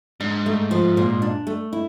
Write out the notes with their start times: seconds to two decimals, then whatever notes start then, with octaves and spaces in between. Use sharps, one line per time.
0.20 G#2 D4
0.46 A3
0.71 F3
0.97 A#2
1.22 D4
1.47 A3
1.73 E4